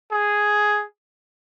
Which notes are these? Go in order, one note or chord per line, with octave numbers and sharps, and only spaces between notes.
G#4